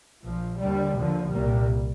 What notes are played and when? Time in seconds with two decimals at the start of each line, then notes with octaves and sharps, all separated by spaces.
0.22 A#1 A#2 F3
0.59 D#2 D3 G3
0.95 D#2 D3 F3
1.31 C2 A#2 G3 A#3